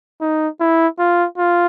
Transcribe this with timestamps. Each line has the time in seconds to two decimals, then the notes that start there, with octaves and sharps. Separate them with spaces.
0.21 D#4
0.60 E4
0.99 F4
1.38 F4